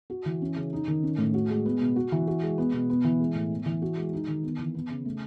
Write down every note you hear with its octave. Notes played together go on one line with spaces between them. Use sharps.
F#4
E3
C#4
C#3
D#4
D#3
C#4
A2
F#4
G#3
B3
B2
F#4
E3
F#4
G#3
B3
B2
B3
E3
G#3
A2
B3
E3
F#4
G#3
D#4
D#3
B3
E3
B3
C#3
A3